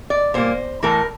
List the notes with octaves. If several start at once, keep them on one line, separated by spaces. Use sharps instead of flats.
D5
A#2 G3 A#3 C5
A2 E3 A3 A#4